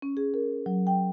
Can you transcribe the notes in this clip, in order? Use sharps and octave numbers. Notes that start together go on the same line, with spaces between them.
C#4
G#4
A#4
F#3
G5